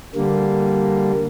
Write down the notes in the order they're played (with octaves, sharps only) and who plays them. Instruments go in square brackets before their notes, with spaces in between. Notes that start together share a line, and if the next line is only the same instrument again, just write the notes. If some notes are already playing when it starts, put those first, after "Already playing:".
[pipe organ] D3 G3 A#3